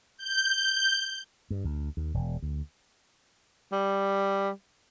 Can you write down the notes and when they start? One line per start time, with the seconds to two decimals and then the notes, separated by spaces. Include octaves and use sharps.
0.17 G6
1.50 G2
1.64 D2
1.97 D#2
2.14 E1
2.43 D2
3.72 G3